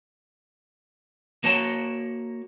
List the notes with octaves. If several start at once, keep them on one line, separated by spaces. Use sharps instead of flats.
A#3 F#4 C#5 A5